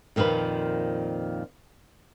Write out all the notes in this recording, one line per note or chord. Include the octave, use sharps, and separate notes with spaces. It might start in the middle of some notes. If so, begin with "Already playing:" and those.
F2 A#2 D#3 F3 B4